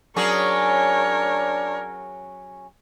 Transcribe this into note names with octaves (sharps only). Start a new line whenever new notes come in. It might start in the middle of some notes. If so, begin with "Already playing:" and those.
F#3 C#4 D4 G#4 A#4 C#5